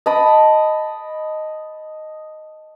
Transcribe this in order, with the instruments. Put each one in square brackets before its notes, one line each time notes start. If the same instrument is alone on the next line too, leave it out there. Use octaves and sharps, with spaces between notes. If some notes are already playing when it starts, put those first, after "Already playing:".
[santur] D#5 A5 B5 D6